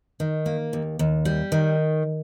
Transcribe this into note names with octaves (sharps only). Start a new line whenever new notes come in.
D#3
A#3
D#2
D#2
G3
D#3